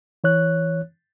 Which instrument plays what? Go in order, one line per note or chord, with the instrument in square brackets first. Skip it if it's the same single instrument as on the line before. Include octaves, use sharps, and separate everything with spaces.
[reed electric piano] E3 C#5 F#6